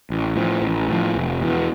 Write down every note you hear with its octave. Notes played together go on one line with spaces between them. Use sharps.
A1
A2 F3
A1
A2 F3
F1
E2 B2